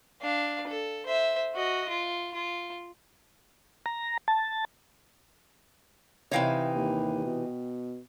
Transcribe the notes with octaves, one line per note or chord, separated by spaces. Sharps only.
D4 F5
A4
C5 E5
F#4 D#5
F4
F4
A#5
A5
C3 E3 D#4 C#5 F5 G5
D#2
B2